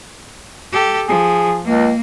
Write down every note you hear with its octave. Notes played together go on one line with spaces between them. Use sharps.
G4 A4
F3 G#4
C#2 A#3